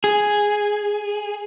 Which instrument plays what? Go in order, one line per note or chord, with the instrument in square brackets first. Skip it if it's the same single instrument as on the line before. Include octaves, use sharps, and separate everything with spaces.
[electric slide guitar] G#4